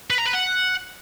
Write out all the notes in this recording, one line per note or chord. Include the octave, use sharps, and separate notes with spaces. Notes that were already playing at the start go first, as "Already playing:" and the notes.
B4
A#5
B4
F#5